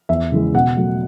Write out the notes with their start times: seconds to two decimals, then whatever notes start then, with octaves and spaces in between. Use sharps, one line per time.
0.09 E2 E5
0.31 C#3 E3 G#3
0.54 B2 F#5
0.77 F#3 A3